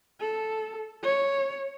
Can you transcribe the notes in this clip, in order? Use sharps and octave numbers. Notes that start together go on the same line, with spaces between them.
A4
C#5